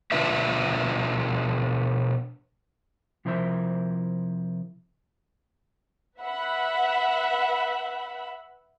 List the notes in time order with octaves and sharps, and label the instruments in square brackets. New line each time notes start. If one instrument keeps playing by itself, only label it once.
[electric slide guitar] B2 D4 F4 B4 E5
C3 F3 E4 A#4 C5 E5
[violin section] B4 E5 F#5 B5